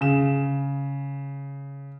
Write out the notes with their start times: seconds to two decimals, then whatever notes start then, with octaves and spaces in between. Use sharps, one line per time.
0.01 C#3 E7